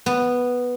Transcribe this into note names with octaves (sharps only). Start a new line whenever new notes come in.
B3